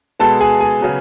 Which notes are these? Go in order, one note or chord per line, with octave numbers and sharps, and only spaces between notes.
B2 G#3 B3 A4 A5
G#4 G#5
G#4 G#5
C#3 F#3 B3